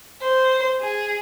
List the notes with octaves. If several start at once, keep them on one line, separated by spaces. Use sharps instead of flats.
C5
G#4